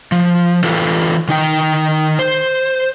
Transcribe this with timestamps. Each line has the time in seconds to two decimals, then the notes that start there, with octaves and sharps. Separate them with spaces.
0.12 F3
0.64 E3 F4 A4 B4
1.28 D#3 D#4 G5
2.19 C5